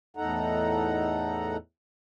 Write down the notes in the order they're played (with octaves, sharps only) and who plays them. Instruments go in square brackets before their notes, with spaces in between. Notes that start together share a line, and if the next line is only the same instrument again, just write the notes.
[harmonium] E2 A2 D#4 A4 F#5 A#5